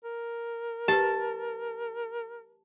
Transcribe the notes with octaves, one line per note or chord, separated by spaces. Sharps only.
A#4
G4 B4 A5